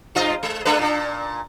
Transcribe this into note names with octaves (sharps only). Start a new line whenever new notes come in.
G2 F4 D#5
G#3
G#3 D4 B4
A#2 D4